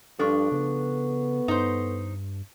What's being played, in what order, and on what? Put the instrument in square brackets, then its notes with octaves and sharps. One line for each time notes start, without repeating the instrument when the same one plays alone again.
[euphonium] G2 [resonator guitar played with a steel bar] F3 D4 [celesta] A4 C#6
[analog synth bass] C#3 [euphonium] B3
[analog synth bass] G2 [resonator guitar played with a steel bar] D#4 C5